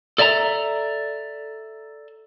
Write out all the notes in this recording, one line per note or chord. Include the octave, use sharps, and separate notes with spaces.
A4 D5 E5 A5 A#5